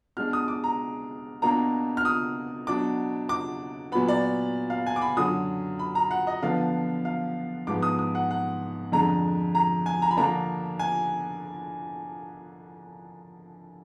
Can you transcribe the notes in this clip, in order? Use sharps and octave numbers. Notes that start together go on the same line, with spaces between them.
B2 G#3 D4 F6
D#6
D6
A#5
B2 A#3 D4 A#5
F6
D#6
B2 F#3 D4 D6
D6
A#2 F#3 B3 B5
D5
F5
G#5
D6
B5
F#2 D3 F#3 D#6
B5
A#5
F#5
D#5
D3 F3 B3 D4 F5
F5
G#2 F3 G#3 B3 D6
D#6
D#6
F#5
F#5
F2 D3 G#3 D4 A#5
A#5
G#5
A#5
B5
D3 F3 A#3 D4 A#5
G#5